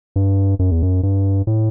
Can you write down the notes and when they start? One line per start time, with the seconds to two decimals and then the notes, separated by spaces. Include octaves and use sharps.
0.16 G2
0.59 F#2
0.71 E2
0.82 F#2
1.03 G2
1.47 A2